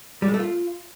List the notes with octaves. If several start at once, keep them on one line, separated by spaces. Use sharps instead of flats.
G3
G#3
A3
F4